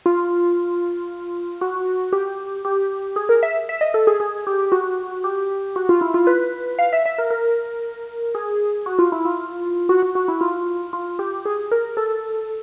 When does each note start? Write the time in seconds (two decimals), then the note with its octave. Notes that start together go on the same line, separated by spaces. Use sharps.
0.06 F4
1.61 F#4
2.13 G4
2.65 G4
3.16 G#4
3.29 A#4
3.43 E5
3.69 E5
3.81 D#5
3.94 A4
4.07 G#4
4.20 G#4
4.47 G4
4.72 F#4
5.24 G4
5.76 F#4
5.89 F4
6.01 E4
6.14 F4
6.27 B4
6.79 F5
6.93 E5
7.06 E5
7.18 A#4
7.31 A#4
8.35 G#4
8.86 F#4
8.99 F4
9.12 E4
9.25 F4
9.89 F#4
10.03 F#4
10.15 F#4
10.28 E4
10.41 F4
10.93 F4
11.19 G4
11.45 G#4
11.72 A#4
11.97 A4